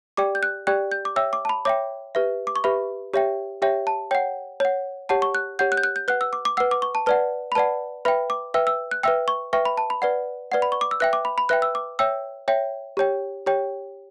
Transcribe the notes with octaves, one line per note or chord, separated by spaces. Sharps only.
G4 D5 G5 D6
G6
F#6
G4 D5 G5 F#6
G6
D6
C#5 E5 G5 E6
D6
A5
B5
C#5 E5 G5 D6
G4 B4 E5
D6
C#6
G4 B4 E5 B5
G4 C#5 E5 G5
G4 C#5 E5 G5
A5
C#5 F#5 G5
C#5 F#5
G4 C#5 F#5 A5
C#6
F#6
G4 C#5 F#5 G6
F#6
G6
F#6
G6
B4 F#5 F#6
E6
D6
D6
B4 F#5 E6
D6
C#6
A5
B4 D5 F#5 A5
B5
B4 D5 F#5 A5
B4 E5 G5 B5
D6
B4 E5 G5 E6
E6
F#6
B4 E5 G5 E6
C#6
B4 E5 G5 C#6
B5
A5
B5
B4 D5 F#5
B4 D5 F#5
B5
C#6
D6
E6
B4 E5 G5 F#6
D6
B5
B5
B4 E5 G5 F#6
E6
D6
C#5 E5 G5 E6
C#5 E5 G5
G4 C#5 G5
G4 C#5 G5